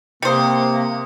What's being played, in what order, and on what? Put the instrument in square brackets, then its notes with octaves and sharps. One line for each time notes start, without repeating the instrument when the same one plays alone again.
[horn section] C3 [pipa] G3 C5 [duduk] A#3 [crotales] D#6 C#7